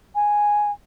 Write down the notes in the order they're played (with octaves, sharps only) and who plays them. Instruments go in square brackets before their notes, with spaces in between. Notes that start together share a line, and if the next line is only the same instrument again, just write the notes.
[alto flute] G#5